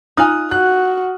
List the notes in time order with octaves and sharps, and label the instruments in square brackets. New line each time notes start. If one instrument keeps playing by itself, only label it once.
[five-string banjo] D#4 F4 G#5 [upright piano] D#6 F6 F#6
[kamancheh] F#4 [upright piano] F#6